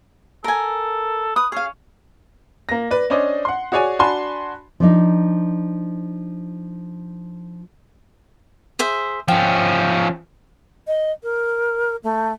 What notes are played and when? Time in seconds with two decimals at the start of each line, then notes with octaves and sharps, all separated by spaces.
0.44 A4 A#4 G#5
1.36 B4 D#6
1.52 C#4 G#4 F5
2.69 A#3 A#6
2.91 B4 D5
3.10 C#4 D4 C5 D5 D#5
3.45 F#5 C6
3.72 F#4 G#4 C#5 D5 G#5
3.99 D4 F#4 G#5 A5 B5 C6
4.80 F3 D4 D#4
8.79 G#4 C5 E5
9.28 F3 C#4 G5
10.87 D#5
11.23 A#4
12.04 A3